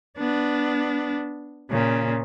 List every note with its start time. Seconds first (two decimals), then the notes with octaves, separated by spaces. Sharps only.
0.18 B3 D4
1.70 A#2 C#3